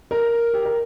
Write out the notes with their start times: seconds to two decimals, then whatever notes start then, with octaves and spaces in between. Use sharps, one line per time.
0.11 A#4
0.54 G4
0.65 A#4